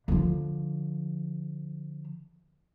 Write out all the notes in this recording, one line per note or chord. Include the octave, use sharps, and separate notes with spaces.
D3 F3